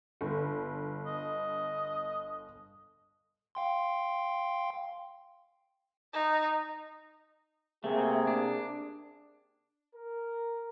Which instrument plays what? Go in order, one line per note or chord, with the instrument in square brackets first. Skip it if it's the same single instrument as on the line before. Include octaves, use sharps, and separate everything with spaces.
[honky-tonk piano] G1
[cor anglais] D#5
[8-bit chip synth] F5 G5 C6
[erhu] D#4
[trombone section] C3 A#3 G#4 [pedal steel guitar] A3
[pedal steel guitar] D4
[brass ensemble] A#4